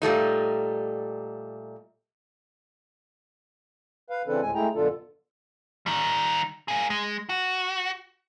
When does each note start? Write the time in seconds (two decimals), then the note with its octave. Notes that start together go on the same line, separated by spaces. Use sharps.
0.02 A#2 G3 A3 D#4
4.10 B4 F5
4.27 C#3 E3 C4 D4 A4 B4
4.42 D2 A2 G#3 G#5
4.55 G#3 A3 E4 G#4 G5 A#5
4.75 F#2 B2 D3 D4 F4 A4
5.86 D#3 G3
6.68 A#3 G#4
6.90 G#3
7.29 F#4